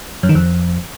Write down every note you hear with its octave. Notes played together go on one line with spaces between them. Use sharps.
F#2
D#3
F2